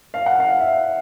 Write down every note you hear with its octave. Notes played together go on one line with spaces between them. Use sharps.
F5
F#5
F5
E5